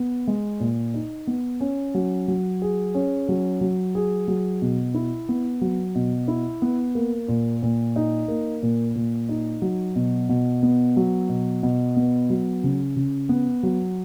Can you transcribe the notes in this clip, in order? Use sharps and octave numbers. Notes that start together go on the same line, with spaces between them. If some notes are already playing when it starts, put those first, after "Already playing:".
Already playing: B3
G#3
A#2
D#4
B3
C#4
F#3
F#3
G#4
C#4
F#3
F#3
G#4
F#3
B2
E4
B3
F#3
B2
E4
B3
A#3
A#2
A#2
D#4
A#3
A#2
A#2
D#4
F#3
B2
B2
B3
F#3
B2
B2
B3
F#3
C#3
C#3
B3
F#3